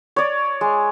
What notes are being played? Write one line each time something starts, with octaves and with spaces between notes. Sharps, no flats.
C#5 D5
G#3